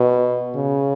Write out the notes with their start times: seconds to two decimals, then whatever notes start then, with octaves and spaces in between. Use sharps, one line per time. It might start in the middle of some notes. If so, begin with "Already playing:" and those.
Already playing: B2
0.56 C#3